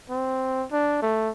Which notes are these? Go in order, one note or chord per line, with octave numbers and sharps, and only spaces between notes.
C4
D4
A3